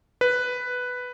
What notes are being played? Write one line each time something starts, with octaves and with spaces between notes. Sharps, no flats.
B4